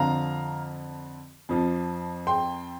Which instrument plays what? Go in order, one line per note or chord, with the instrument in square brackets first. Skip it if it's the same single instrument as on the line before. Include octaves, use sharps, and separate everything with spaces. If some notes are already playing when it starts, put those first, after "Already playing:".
Already playing: [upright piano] F2 D3 F3 F5 A#5
F2 F3
G5 C6